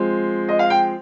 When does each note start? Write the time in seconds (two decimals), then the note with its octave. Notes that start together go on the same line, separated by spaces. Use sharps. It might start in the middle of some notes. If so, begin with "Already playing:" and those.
Already playing: F3 G#3 C4
0.49 D#5
0.59 F5
0.70 G5